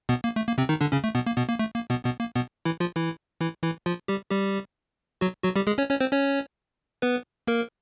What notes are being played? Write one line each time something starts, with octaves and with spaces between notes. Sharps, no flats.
B2 B3
A#3
A3
A#3
C3 C4
D#3 D#4
D3 D4
C#3 C#4
A3
B2 B3
A#3
B2 B3
A#3
A3
A#3
B2 B3
B2 B3
A#3
B2 B3
E3 E4
F3 F4
E3 E4
E3 E4
E3 E4
F3 F4
G3 G4
G3 G4
F#3 F#4
F#3 F#4
G3 G4
G#3 G#4
C#4 C#5
C#4 C#5
C4 C5
C#4 C#5
B3 B4
A#3 A#4